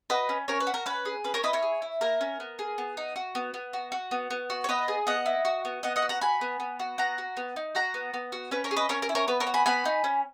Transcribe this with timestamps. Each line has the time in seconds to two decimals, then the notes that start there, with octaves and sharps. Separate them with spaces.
0.10 F#4 B4 D#5
0.29 C#4
0.48 C#4 A#4 C#5
0.60 B4
0.67 F#4
0.74 A#4
0.86 C#4 B4
1.05 G#4
1.24 C#4 B4
1.34 A#4 C#5
1.43 E4 B4 D#5
1.53 A#4 C#5
1.62 G#4
1.82 E4
2.01 A#3 A#4
2.21 C#4
2.40 B3
2.59 G#4
2.78 B3
2.97 D#4
3.16 F#4
3.35 B3
3.54 B3
3.73 F#4
3.92 F#4
4.11 B3
4.31 B3
4.50 F#4
4.64 C#5
4.69 B3 B4 D#5
4.88 G#4
5.07 B3 D#5 F#5
5.26 E4
5.45 F#4
5.65 B3
5.83 B3 D#5 F#5
5.96 D#5 F#5
6.02 F#4
6.09 F#5 A#5
6.21 F#4 G#5 B5
6.41 B3
6.60 B3
6.79 F#4
6.98 B3 F#5 A#5
7.18 F#4
7.37 B3
7.56 D#4
7.75 F#4 F#5 A#5
7.94 B3
8.14 B3
8.32 F#4
8.51 C#4 B4
8.64 A#4 C#5
8.71 G#4
8.77 B4 D#5
8.89 C#4 A#4 C#5
9.02 A#4
9.09 E4
9.15 A#4 C#5
9.28 B3 B4
9.40 A#4 C#5
9.47 F#4
9.54 G#5 B5
9.66 B3 G#5 B5
9.85 D#4
10.04 C#4